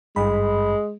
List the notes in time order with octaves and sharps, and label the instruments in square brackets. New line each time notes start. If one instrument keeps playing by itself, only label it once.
[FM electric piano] G#1 G2 B5 [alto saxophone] G#3